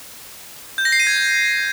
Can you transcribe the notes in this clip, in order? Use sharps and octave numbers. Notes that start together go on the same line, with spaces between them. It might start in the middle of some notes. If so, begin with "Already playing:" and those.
G6
A#6
C7
D#7
G#6